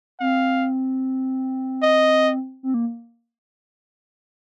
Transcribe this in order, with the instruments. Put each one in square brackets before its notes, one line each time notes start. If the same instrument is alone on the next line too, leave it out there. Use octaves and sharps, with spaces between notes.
[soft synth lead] C4 [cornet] F5
[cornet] D#5
[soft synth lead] C4
A#3